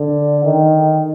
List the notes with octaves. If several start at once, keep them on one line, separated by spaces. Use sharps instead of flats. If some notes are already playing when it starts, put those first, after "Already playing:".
Already playing: D3
D#3